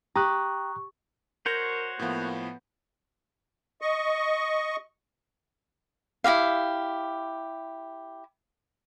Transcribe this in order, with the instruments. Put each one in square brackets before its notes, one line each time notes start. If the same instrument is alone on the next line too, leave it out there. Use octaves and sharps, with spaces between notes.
[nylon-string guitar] G4 [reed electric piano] A#5 D#6 F#6 [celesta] C#6
[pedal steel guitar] F#4 C5 C#5 [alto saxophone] A#4 [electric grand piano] G6 A#6
[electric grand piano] A2 F3 [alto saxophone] A#3 [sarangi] B3
[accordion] D#5 C#6
[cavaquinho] E4 F4 G4 F5